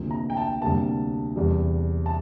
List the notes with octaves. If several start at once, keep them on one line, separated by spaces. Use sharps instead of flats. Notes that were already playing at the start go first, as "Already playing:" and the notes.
Already playing: D2 C3 F3 A#3
A#5
G5
A5
D2 C3 G3 A#3 A5
E2 C3 G3
A5